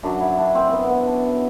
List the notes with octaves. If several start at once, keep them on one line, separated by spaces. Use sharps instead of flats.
F#2 F#3 D4
E4
D4
C4
B3 C4
B3
D4